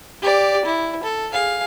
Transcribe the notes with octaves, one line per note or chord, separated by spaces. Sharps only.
G4 D5
E4
A4
G#4 F5